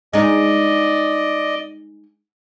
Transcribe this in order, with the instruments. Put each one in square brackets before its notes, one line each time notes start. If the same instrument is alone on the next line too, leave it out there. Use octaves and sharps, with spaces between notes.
[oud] G#3 D#4 [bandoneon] D5 D#5